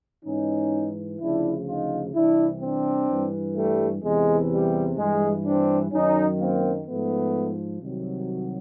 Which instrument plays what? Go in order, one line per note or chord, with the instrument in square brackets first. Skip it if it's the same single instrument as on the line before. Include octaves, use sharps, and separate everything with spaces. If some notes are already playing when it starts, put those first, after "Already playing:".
[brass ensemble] G#2 E3 C#4 D#4
D2 C#3 F3 D4 E4
D#4 F4
C2 C3 E3 D4 E4
C4 D4
G2 E3
G3 A3
E2 C3 E3 G#3
G3
G2 E3 G#3
C4 D4
F#2 D#3 F#3 C#4 D#4
A#3 C4
G#2 F3 A3 B3
C2 C3 D#3 F#3